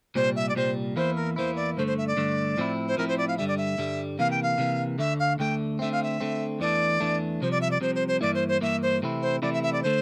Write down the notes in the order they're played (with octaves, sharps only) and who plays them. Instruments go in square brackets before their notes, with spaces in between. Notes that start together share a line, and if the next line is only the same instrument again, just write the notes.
[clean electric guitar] C2 A#2 G3 [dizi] C5
[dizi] E5
D5
[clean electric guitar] C2 A#2 G3 [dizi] C5
[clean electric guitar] E2 E3 A#3 E4 [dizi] C5
[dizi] A#4
[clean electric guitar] E2 E3 A#3 E4 [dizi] C5
[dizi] D5
[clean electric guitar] G2 D3 A3 [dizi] C5
[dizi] C5
E5
D5
[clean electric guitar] G2 D3 A3
A2 F3 C4 E4
[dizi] C5
[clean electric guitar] A2 F3 C4 E4 [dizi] A#4
[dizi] C5
D5
F5
[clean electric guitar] G2 D3 G3 [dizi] E5
[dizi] D5
E5
[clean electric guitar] G2 D3 G3
[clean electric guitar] C3 E3 A#3 [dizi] F5
[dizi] G5
F5
[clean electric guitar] C3 E3 A#3
[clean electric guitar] D2 D3 A3 [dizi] E5
[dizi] F5
[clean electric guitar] D2 D3 A3 [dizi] G5
[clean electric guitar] D3 A3 C4 [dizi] E5
[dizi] F5
E5
[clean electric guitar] D3 A3 C4
[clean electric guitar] E2 E3 A3 D4 [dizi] D5
[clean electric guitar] E2 E3 A3 D4
[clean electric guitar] C2 C3 F3 [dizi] C5
[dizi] D5
E5
D5
[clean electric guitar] C2 C3 F3 [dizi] C5
[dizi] C5
C5
[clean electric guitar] G2 E3 A#3 E4 [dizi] D5
[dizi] C5
C5
[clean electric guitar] G2 E3 A#3 E4 [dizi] E5
[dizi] C5
[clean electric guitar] C3 E3 A3 C4 E4
[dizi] C5
[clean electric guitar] C3 E3 A3 C4 E4 [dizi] D5
[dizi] E5
E5
D5
[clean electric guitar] D3 A3 [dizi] C5